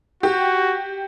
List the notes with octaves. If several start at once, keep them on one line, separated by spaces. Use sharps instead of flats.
F#4 G4